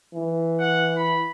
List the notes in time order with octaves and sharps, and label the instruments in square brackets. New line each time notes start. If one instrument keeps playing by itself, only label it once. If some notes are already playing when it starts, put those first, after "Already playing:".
[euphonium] E3
[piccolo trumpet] F#5
B5